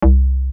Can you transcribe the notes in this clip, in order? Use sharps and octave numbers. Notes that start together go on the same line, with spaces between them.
C2